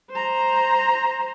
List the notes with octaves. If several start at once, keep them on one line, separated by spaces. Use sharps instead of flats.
C5 A#5